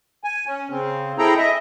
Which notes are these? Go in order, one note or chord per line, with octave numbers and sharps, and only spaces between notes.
G#5
C#4
C#3 C4
C4 E4 G#4 A4 G5 A#5
D#5 E5